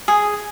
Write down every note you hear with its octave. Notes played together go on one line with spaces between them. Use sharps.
G#4